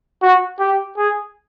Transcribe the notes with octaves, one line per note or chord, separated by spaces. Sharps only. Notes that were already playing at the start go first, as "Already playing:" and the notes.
F#4
G4
G#4